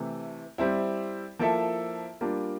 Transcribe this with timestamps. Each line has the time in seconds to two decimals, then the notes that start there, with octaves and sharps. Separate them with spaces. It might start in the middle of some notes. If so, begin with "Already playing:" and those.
Already playing: C3 E3 A3
0.58 G3 C4 E4
1.39 F3 A#3 E4 A4 E5
2.21 G3 A#3 D4 F4